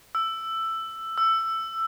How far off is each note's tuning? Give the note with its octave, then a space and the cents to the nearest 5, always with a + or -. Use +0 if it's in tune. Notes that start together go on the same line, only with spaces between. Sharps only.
E6 +10
E6 +15